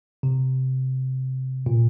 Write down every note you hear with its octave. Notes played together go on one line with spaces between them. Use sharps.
C3
A#2